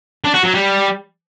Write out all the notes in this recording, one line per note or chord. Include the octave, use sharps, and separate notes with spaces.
D4
F#4
F#3
G3